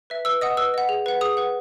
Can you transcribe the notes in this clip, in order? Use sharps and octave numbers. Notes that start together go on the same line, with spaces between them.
B4 E5
B4 E6
D#5 F#5 D#6
B4 E6
D#5 F#5
G#4
B4 F#5
G#4 D#6
B4 F#5